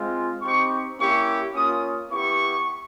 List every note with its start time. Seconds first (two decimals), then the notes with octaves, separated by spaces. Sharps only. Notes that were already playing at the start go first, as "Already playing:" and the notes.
Already playing: G#3 C4 F4
0.42 C4 D#4 G4 C#6
0.97 A#3 C#4 E4 G4 C#6
1.54 A#3 C#4 F4 D#6
2.10 B3 E4 G4 C#6